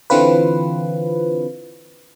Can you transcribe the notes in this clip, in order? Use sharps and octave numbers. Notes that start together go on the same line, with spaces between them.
D3 E3 C4 F4 B4